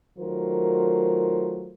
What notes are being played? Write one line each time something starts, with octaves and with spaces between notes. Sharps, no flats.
D#3 F#3 A3 F4 A#4 C5